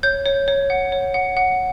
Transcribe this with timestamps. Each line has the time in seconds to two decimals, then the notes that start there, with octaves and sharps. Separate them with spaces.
0.03 C#5 G6
0.26 C#5
0.48 C#5
0.70 F#5
0.92 C#5
1.14 F#5
1.37 F#5